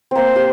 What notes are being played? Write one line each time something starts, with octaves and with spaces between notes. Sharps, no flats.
A#3 C4 C5
G4